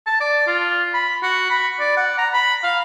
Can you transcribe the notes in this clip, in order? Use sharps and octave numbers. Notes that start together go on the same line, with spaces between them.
A5
D5
F4
B5
F#4
B5
D5
F#5
A#5
B5
F5